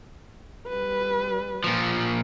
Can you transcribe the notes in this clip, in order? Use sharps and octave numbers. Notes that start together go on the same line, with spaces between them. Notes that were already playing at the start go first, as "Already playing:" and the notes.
G3 B4
A#2 F3